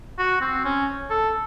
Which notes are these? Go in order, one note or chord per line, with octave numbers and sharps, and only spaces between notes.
F#4
C4
C#4
A4